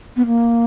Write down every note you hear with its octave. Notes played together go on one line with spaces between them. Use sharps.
B3
A#3